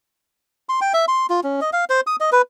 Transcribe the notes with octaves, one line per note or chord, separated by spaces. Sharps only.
C6
G5
E5
C6
F4
C#4
D#5
F5
C5
D#6
D#5
B4